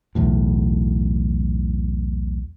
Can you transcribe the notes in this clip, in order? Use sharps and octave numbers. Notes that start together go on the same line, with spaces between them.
B1 E2 A2